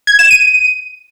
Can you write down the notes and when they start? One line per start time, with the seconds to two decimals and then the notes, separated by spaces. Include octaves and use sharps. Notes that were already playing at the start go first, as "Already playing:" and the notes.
0.07 G#6
0.19 E7
0.31 D#7